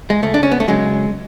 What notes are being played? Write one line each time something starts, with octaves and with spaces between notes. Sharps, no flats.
G#3
C#2 A3
D4
C#4
B3
A3
C#3 F#3 G#3